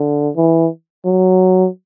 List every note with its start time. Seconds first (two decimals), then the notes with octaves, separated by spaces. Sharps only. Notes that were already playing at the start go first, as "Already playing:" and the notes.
Already playing: D3
0.37 E3
1.05 F#3